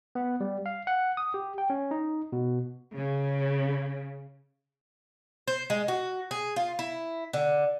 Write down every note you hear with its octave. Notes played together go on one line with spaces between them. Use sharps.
B3
G3
F5
F#5
D#6
G4
G5
C#4
D#4
B2
C#3
C5
G#3
F#4
G#4
F4
E4
D3